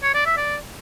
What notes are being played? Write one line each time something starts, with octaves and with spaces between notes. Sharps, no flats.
C#5
D5
E5
D5